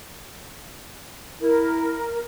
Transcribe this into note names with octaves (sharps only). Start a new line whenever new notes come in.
E4 A#4